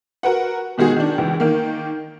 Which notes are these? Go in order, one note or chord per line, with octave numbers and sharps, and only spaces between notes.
F#4 A#4 B4 F#5
B2 D#3 G#3 F#4 G#4
D#3 D4
C#2 E3
D#3 A#3